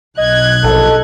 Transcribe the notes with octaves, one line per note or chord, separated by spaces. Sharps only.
B1 D#5 F#6 G#6
A#1 A4